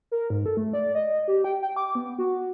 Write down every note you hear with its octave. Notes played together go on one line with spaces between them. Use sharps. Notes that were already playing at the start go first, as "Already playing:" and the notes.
A#4
G#2
A4
A3
D5
D#5
G4
G5
G5
D6
B3
F#4